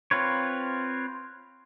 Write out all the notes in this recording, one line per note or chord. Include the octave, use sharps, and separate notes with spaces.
C4 F4 B4 C#5